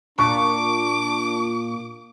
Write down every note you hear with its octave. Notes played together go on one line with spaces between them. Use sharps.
A#2 D4 C#6 D6